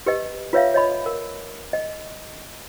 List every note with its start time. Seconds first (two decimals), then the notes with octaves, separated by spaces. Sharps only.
0.06 G4 B4 D#5
0.53 F4 B4 C#5 E5 F5
0.74 C#5 D#5 B5
1.06 A#4
1.73 D#5